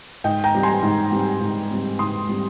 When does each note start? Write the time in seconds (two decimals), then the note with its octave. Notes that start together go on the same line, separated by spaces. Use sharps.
0.24 G#2 D#5 G5
0.44 G5 A#5
0.54 G3 C4
0.63 G#5 C6
0.83 G#2
1.12 G3 C4
1.41 G#2
1.70 G3 C4
1.99 G#2 C6 D#6
2.29 G3 C4